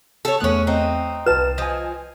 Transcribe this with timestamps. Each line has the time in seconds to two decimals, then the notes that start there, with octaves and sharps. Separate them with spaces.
0.25 A4 C#5
0.40 E2 A3 B3 C#4 F#6
0.67 C4 D#4
1.26 C2 B4 A5 E7
1.58 F3 D#5 G#5